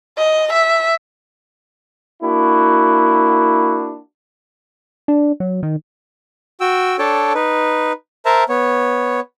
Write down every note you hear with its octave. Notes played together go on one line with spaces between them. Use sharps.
D#5
E5
A#3 D4 E4 F#4
D4
F#3
D#3
F#4 G5 E6
D4 A4 C#5 G5 A5
D#4 B4
A#4 C5 E5 A5 A#5
B3 C#5